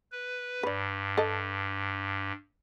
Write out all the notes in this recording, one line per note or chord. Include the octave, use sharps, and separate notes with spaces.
B4
G2 B4 D5
A4 D#5